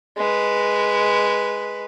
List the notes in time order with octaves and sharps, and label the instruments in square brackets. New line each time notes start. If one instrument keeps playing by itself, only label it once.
[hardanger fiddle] G#3 B4